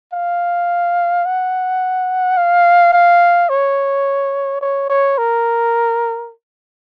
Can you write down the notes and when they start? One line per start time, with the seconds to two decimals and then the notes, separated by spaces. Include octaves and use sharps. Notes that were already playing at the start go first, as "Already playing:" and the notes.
0.13 F5
1.25 F#5
2.37 F5
2.93 F5
3.49 C#5
4.61 C#5
4.90 C#5
5.18 A#4